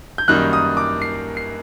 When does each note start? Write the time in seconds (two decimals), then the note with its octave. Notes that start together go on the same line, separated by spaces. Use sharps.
0.18 G6
0.28 F#2 D#3 G3 A#3 D#4 F#6
0.53 D#6
0.77 D6
1.02 C7
1.37 C7